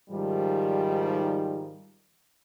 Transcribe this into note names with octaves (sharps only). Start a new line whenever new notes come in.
G#2 D#3 F3 G3